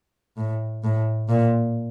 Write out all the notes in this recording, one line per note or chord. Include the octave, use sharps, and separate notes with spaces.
A2
A2
A#2